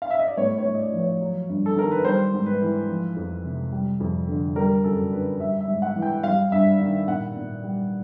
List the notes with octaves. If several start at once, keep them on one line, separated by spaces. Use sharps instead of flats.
F5
E5
D#5
D5
A2 C#5
C#5
A2
D#5
D5
F3
C#5
F#3
G2
A4
D#3 A#4
B4
G3 C5
G#2
B4
E3
F3
F2
C3
G3
F2
D3
G3 A#4
F#2 A4
D3 B4
G3 E5
E5
G#2
F#5
E3
G5
G3 F5
G2 E5
D#3
A#2 F#5
A#2
G3